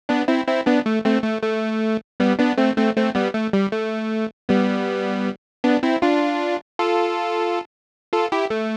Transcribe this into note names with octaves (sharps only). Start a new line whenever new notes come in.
B3 D4
C4 E4
C4 E4
B3 D4
A3
A3 C4
A3
A3
G3 B3
B3 D4
A3 C4
A3 C4
A3 C4
G3 B3
A3
G3
A3
G3 B3
B3 D4
C4 E4
D4 F4
F4 A4
F4 A4
E4 G4
A3